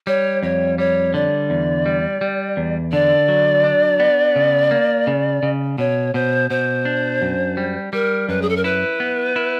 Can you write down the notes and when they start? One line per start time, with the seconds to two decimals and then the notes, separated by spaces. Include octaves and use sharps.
0.07 G3 C#5
0.43 F2 C#5
0.78 G3 C#5
1.14 D3 D5
1.50 E2
1.86 G3
2.21 G3
2.57 E2
2.92 D3 D5
3.28 F#3
3.64 D4
4.00 B3
4.36 C#3
4.71 A#3
5.07 C#3
5.43 C#3
5.78 B2 C#5
6.14 B2 C5
6.50 B2 C5
6.85 D4
7.22 F#2
7.57 G3
7.93 G3 A#4
8.29 F#2 B4
8.42 G#4
8.49 A4
8.56 A#4
8.64 E4 B4
9.00 B3
9.36 E4